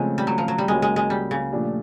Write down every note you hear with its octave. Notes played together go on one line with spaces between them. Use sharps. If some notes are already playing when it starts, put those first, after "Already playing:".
Already playing: C#3 F3 G#3 A3 C4
G3
F#3
F3
F#3
G3
C#2 C#3 F#3 G#3 A#3
G#3
G#3
G3
C#3
A#2 F3 A3 D4 G4